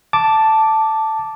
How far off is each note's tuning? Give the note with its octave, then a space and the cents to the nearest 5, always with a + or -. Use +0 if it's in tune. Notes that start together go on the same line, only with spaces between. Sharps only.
A5 +0 D6 +0